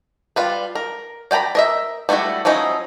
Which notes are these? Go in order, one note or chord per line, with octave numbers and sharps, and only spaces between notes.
G3 F4 B4
A#4
D5 G5 G#5 A#5 B5
A#4 D#5 E5
G3 A3 D#4 E4 F#4
F3 F#3 C#4 D#4 E4